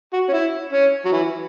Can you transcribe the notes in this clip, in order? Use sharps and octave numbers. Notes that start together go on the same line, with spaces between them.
F#4
C#4
E4
C#4
F#3
E3